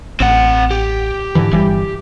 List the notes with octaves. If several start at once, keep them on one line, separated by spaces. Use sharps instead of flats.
A1 C4 F#5
G4
G#2 D3 E3
G1 E3 G3